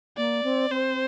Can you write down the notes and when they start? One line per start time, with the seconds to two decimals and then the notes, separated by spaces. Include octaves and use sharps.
0.17 A#3 D5
0.44 C4
0.70 C4 C5